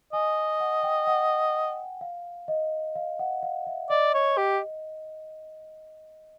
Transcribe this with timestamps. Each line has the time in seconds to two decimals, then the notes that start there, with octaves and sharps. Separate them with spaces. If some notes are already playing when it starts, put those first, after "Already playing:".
0.13 D#5 G#5
0.60 F#5
0.83 G5
1.07 F#5
2.01 F5
2.48 D#5
2.96 F5
3.19 F#5
3.43 F5
3.67 E5
3.90 D5 D#5
4.14 C#5
4.37 G4